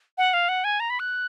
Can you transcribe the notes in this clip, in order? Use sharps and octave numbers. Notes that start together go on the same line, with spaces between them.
F#5
F5
F#5
G#5
A#5
B5
F#6